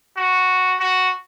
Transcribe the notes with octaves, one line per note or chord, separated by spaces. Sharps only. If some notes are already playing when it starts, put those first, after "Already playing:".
F#4
F#4